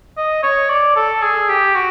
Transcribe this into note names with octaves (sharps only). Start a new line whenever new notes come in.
D#5
C#5
D5
A4
G#4
G4
F#4